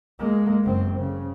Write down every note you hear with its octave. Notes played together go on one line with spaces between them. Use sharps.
G#3 A#3
F#1 C4
C#3